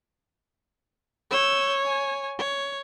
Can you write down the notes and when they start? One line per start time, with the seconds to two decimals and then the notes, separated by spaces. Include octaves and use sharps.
1.31 C#5 E6 G6
1.85 G#5
2.38 C#5